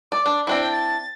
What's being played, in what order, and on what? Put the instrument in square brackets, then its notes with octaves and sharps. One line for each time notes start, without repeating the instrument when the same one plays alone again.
[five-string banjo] D5 [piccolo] D6
[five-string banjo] D4
[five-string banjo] C4 D4 E4 [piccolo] G5
[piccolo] A6